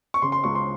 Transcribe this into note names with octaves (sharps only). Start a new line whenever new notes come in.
C#6
C#3 C6
C6
C#2 C#6
C6